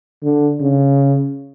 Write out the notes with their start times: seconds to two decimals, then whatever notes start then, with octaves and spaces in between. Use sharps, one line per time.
0.23 D3
0.61 C#3